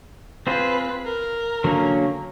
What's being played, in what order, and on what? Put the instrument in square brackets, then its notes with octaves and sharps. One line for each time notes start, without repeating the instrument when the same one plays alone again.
[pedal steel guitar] C4 F4 G#4 C5 [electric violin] B4
[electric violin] A#4
[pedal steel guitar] D3 F#3 A#3 C#4